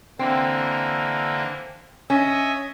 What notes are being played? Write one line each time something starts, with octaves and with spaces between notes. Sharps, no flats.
D3 E3 A#3 C4
C#4 D#5 E5